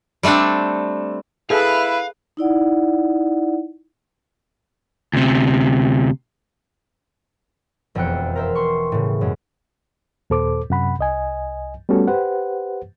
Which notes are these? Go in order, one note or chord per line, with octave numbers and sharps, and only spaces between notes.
G3 A3 C4 D4 A4
E4 G#4 A4 B4 E5 F5
D#4 E4 D5 F#5
D2 C3
E1 F2 E3 G5 F#6 C#7
A#4 C5 E5
C6 C#6
A2 C#3
F#2 G#3
D#2 A#2 A4 C5 D6
F#2 C3 F#5 B5
C2 D#5 G#5
G3 A3 B3 C#4 F#4 A4
G4 B4 C5 F#5